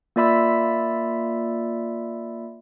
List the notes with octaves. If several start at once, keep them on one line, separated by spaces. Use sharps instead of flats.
A#3 F4 D5 E5 B5 E6